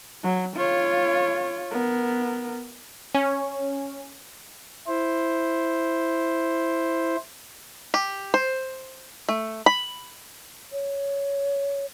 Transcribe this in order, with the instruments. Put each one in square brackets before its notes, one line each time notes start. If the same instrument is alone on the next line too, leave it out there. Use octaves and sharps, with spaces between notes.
[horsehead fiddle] F#3
F4 C#5
B3 A#4
[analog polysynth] C#4
[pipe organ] E4 C5
[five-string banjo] G4
C5
A3
B5
[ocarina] C#5